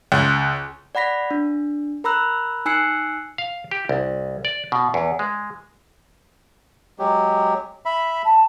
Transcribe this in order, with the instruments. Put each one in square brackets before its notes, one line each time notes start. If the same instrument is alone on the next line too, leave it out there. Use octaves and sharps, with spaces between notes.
[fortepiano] C#2
[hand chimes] D5 F#5 B5 A#6 B6
D4
A#4 A#5 B5 E6 F#6
D#4 G#5 E6 F#6 C7 C#7
[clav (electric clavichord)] F5
G4
C2
D5
B2
E2
G#3
[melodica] F#3 G#3 G4
E5 B5
[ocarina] A5